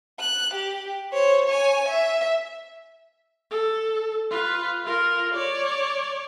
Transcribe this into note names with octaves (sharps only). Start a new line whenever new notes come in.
F#6
G4
C5 C#5
C#5 G#5
E5
A4
F4 B4
F4 A#4
C#5 D5